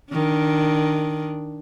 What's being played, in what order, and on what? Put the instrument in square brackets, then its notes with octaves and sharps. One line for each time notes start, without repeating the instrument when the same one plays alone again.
[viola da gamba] D#3 D4